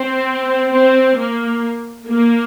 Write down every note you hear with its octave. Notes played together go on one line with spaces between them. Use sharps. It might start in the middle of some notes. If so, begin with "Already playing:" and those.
Already playing: C4
C4
A#3
A#3